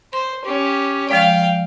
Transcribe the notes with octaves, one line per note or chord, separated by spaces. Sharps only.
C5 C6
C#4 G4
F3 G#3 D5 F5 G5